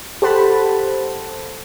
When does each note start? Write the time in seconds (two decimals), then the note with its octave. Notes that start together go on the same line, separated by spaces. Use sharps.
0.22 G4 A4 C5 F#5 A5 B5